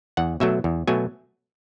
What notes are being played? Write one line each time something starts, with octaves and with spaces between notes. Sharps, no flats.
E2 F#5
B2 F#3 A3 E5
E2
B2 F#3 A3 G#5